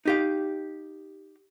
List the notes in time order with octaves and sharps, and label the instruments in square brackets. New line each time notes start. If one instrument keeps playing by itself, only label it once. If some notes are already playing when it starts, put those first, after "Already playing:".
[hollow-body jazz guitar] D#4 G4 F5